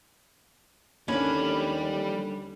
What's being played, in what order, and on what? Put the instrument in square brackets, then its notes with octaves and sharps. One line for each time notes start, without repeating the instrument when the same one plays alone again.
[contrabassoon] D#2 [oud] D3 A#3 [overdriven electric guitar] G3 B5 [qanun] C#4 D4 B4